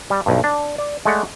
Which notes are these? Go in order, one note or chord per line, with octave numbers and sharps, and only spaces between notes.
G3
B1 G2
D4
D5
G#3 A3 A4 D5 F#5